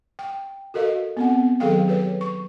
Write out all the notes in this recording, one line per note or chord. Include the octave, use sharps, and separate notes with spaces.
G5
F#4 A4 A#4 D#5 F5
B3 C4 F#5
D#3 F#3 G#4 A4 F5 G5
G4 B4 C#5
C#6